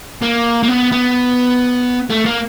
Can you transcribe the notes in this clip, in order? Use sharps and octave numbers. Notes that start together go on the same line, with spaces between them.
A#3
A#3
B3
B3
A3
A#3